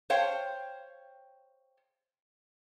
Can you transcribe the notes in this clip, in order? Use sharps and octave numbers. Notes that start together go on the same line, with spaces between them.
C5 C#5 F5 G5